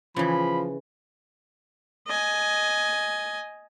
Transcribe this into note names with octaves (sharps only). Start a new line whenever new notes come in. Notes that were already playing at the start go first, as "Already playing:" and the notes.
C#3 E3 F3 B5
D#5 G#5